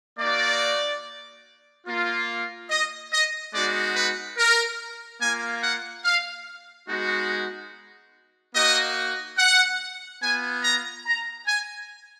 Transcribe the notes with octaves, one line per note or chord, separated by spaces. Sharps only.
A#3 D#4 F#4 D5
A#3 F4
D#5
D#5
G#3 B3 D#4 F#4 D5
B4
A#4
A#3 F4 G#5
F#5
F5
G#3 B3 D#4 F#4
A#3 D#4 F#4 D#5
F#5
B3 F4 G#5
A#5
A#5
G#5